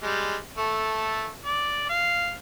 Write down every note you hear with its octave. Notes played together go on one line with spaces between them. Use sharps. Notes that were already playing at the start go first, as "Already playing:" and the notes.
G3 G#3
A3 A4
D5
F5